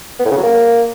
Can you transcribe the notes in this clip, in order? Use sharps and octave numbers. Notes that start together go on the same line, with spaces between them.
B3
A2
C#3
F#3
A#3